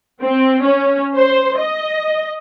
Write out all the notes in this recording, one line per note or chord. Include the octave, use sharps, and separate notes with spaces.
C4
C#4
C5
D#5